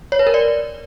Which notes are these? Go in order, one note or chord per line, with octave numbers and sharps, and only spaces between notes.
C#5
B4
A#4
D5